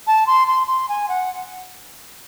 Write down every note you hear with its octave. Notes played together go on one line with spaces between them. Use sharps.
A5
C6
C6
C6
G#5
F#5